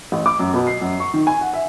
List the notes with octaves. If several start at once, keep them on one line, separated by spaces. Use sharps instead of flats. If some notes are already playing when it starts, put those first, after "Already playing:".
A1
D6
F#2
B2
C7
F#2
C#6
D#3
G#5
F#5
E5